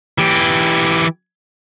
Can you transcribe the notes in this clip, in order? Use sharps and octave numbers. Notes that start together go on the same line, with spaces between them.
E3 G4